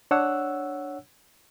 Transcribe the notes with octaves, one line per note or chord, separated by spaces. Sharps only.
D4 C#5 F#5 E6 F#6